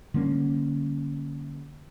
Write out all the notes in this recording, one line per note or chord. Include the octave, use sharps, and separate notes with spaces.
D3 G3 A#3 C#4